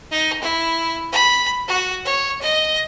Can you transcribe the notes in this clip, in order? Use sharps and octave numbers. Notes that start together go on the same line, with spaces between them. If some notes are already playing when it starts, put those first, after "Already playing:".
D#4
E4
B5
F#4
C#5
D#5